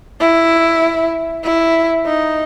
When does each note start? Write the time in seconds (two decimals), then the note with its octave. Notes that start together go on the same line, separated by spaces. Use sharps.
0.20 E4
1.44 E4
2.06 D#4